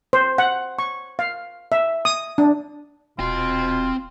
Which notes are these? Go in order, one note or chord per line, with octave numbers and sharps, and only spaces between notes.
C5
F#5
C#6
F5
E5
D#6
D4
D#1 B2 C4 F4 C6